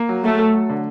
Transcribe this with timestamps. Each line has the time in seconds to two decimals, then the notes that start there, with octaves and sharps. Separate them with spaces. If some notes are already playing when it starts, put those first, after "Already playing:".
Already playing: A#3
0.09 F#3
0.24 F#3 A3
0.39 A4
0.54 F#3
0.70 D3